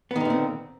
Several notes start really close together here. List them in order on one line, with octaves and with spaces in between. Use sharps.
B3 D#3 D3 A#2 C4